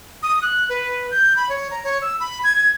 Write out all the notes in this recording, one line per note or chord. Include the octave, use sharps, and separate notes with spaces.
D#6
F#6
B4
G6
B5
C#5
A#5
C#5
E6
B5
G#6
G#6